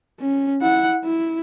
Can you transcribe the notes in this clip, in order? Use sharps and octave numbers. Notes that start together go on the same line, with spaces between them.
C#4
E4 F#5
E4